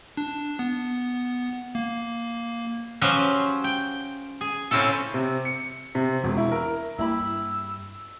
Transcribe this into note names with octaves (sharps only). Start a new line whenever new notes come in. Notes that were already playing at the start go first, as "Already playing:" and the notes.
D4
B3
A#3
F3 F#3 C#4 G4 B4 C5
G5
G#4
A2 C#3 C4 C#4 E4 A4
C3
C#7
C3
E1
E4
A#4
G2 A#3 E4 G4 B5 E6